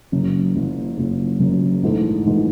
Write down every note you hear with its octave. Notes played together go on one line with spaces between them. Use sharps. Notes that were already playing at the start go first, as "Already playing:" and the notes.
F#1 F#2 C#3
F#1 F#2 C#3
F#1 F#2 C#3
F#1 F#2 C#3
A#1 G#2 E3 A3
A#1 G#2 E3 A3